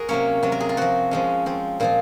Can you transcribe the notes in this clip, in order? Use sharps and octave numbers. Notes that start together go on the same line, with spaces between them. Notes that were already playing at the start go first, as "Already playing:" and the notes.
Already playing: F#4 G#4 A#4
C3 F#3 A#3 C#4 C#5
C3 F#3 C4
A#4
G#4
F4
F3 C4 F#4
F3 G#3 C#4
F3 C4
A#2 F3 C4 F4